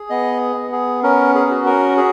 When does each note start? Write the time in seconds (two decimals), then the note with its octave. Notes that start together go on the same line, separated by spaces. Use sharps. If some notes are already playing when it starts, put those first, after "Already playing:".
Already playing: G#4
0.10 B3 D#5
0.56 B3
0.72 G#4
1.03 C#4 A#4
1.35 G#4
1.51 F#4
1.66 A#4
1.97 G#4